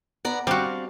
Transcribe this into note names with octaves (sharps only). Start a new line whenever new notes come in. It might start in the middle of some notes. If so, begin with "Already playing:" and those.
B3 D5 A#5
G3 C4 D4 F#4 F5